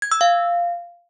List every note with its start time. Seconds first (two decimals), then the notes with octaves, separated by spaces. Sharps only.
0.02 G#6
0.12 E6
0.21 F5